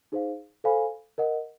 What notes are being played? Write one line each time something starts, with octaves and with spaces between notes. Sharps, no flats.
D#4 G#4 C5 F5
A4 C5 F5 G#5 B5
A#4 D#5 F#5